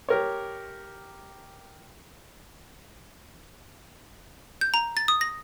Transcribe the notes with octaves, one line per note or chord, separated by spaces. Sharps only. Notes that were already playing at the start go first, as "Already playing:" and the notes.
G4 A#4 C#5
G6
A#5
A6
D#6
A#6